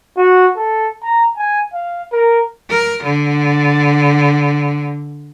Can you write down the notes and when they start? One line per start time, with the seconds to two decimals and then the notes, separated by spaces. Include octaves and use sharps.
0.17 F#4
0.56 A4
1.03 A#5
1.37 G#5
1.74 F5
2.12 A#4
2.70 A#4
3.03 D3